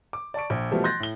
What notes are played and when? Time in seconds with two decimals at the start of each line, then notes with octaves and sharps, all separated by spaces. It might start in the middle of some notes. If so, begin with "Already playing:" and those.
0.13 D6
0.34 D5 A5 C#6 D7
0.50 A#1
0.71 B2 E3 F3 G3 A3 F#4
0.84 C6 F#6 G6 A6 A#6
1.00 A2 G7